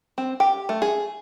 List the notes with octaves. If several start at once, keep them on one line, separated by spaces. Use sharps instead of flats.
C4
G4
A3
G#4